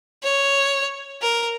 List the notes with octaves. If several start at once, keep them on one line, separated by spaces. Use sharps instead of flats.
C#5
A#4